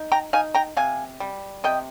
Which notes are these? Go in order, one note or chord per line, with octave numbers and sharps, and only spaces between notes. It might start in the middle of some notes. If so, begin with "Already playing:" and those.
Already playing: D#4
G5 A#5
D#4 F5 G#5
G5 A#5
C3 F5 G#5
G3
C3 D#5 G5